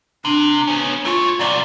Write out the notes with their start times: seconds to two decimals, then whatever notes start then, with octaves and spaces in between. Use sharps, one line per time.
0.25 C3 D4
0.67 B3 C#4
1.05 A3 F4 C#5
1.39 C2 A#2 D5